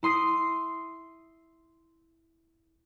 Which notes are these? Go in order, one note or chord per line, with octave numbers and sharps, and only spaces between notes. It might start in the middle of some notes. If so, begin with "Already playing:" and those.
E4 C6 D#6 C7